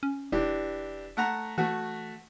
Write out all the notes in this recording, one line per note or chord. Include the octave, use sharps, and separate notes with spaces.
C#4
E1 E3 D4 G4
A3 F#5 A#5
E3 A3 F#4